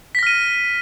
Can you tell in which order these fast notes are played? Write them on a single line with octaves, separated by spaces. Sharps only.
B6 A#6 F6 D#7